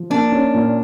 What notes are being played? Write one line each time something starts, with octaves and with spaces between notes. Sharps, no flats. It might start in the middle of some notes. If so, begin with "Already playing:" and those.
Already playing: F3
A#3 D4
C#4
A#2